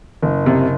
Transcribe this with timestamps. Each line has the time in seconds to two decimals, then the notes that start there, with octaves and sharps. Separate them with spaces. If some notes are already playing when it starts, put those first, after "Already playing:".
0.22 F#1
0.46 C3